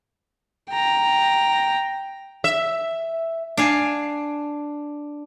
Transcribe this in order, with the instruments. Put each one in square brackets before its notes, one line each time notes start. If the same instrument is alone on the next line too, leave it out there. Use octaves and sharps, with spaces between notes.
[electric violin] G5 A#5
[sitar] E5
[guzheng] D4 F5 G#5